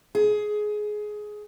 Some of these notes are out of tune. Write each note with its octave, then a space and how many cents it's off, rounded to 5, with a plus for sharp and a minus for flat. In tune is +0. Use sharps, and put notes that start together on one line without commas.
G#4 +15